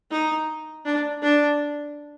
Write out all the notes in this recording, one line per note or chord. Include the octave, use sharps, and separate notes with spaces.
D#4
D4
D4